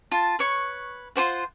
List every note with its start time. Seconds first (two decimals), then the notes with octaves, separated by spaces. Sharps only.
0.11 F4 A5
0.39 B4 C#5 C#6
1.16 F4 F#4 C5 F#5